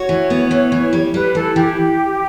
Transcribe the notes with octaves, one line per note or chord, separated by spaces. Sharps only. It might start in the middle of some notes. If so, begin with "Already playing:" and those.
Already playing: F#4 C#5
E3
B3
E3
E3
G3
G3 B4
E3 A4
E3 G4